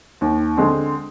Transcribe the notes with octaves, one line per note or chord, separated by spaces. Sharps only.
D#2
D3 G#3 C4